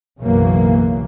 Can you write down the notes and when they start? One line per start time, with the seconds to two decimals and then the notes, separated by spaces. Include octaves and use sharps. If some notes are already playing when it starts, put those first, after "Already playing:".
0.20 B1 F#2 C#3 E3 F#3 A#3